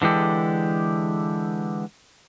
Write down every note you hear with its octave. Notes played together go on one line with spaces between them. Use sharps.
D3 E3 G#3 G4 A4